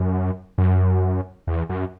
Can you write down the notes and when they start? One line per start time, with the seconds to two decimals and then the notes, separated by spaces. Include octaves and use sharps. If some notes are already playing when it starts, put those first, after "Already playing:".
Already playing: F#2
0.58 F#2
1.47 E2
1.69 F#2